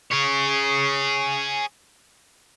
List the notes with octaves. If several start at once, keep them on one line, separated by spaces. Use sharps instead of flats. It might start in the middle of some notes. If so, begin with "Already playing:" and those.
G#4 C#5